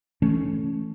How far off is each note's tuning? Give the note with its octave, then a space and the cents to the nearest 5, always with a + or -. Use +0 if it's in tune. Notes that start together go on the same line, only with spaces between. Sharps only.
E3 +0 A3 -5 C#4 +0